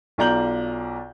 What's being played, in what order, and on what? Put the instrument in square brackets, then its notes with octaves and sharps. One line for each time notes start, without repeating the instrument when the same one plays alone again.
[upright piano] B1 F4 D5 A#5 G6 F#7